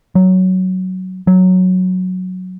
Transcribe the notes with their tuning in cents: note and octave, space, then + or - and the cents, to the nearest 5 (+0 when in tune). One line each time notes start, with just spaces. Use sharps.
F#3 +5
F#3 -5